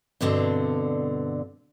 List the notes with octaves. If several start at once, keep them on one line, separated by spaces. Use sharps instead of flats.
G2 B2 D3 C4